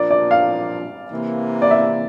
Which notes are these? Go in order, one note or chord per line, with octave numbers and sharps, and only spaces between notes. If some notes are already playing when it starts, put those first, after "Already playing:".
Already playing: A#2 F3 A#3 D4 F4 D5
D5
F5
C3 E3 A#3
D5
E5